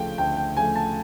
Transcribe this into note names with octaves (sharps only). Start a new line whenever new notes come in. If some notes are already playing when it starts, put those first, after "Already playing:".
Already playing: D2 C#3 F3 A3 G5
D2 G5
G5
C#3 F3 A3 G#5
A5